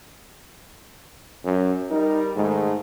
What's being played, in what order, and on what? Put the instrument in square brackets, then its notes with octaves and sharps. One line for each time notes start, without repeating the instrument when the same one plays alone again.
[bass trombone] F#2
[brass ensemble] G3 A#4 [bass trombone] D#4
[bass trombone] G#2 [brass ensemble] D#3 G#3 A3